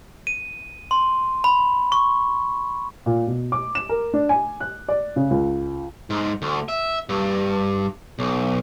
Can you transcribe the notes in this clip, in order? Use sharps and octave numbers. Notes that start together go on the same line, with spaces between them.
D#7
C6
B5
C#6
A#2
B2
D6
E7
A#4
D4
G#5
F#6
D5
C#3
C#2
G#2
D2
E5
G2
B1